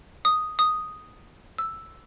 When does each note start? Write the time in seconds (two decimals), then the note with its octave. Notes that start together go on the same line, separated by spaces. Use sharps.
0.25 D#6
0.59 D#6
1.58 E6